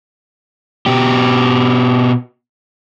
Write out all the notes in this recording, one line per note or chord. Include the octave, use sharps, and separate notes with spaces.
B2 G4